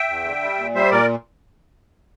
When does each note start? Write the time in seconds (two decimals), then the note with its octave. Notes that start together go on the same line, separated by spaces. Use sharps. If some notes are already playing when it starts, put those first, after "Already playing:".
Already playing: E5 G5
0.09 E2
0.25 D3
0.42 G3
0.58 A#2
0.75 G3 C5 E5
0.91 A#2 A#4 D5